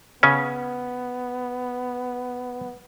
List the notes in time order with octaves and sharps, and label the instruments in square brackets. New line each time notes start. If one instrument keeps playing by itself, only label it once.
[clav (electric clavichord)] C#3 C#4 [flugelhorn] B3